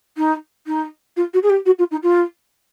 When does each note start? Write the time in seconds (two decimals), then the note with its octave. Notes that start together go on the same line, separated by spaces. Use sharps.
0.17 D#4
0.67 D#4
1.17 F4
1.34 F#4
1.43 G#4
1.50 G4
1.66 F#4
1.79 F4
1.91 D#4
2.03 F4